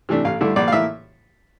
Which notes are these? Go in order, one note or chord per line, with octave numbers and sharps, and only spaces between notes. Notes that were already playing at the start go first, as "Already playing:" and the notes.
C3 E3 A3 D4
A1 F5
G2 D3 A3 E4
A#1 D5
F5
A2 E3 A#3 E5